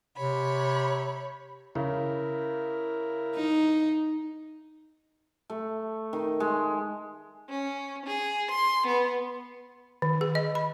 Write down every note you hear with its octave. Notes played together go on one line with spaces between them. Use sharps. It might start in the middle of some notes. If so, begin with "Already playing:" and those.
C3 C#5 B5
C#3 E4 A#4
D#4
A3
D#3
G#3
C#4
G#4
C6
B3
D#3
G#4
D#5
B5